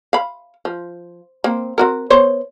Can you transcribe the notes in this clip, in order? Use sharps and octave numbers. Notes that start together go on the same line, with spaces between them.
F5 B5
F3
A#3 C4
C4 F#4 A#4
B3 C5 C#5